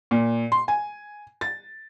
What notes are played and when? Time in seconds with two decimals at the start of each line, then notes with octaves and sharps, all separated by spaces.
0.11 A#2
0.52 C6
0.68 G#5
1.41 A6